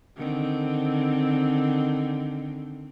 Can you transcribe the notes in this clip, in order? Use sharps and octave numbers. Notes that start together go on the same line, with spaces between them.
D3 D#3 C4